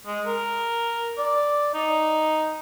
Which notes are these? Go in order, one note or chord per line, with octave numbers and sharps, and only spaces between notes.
G#3
A#4
D5
D#4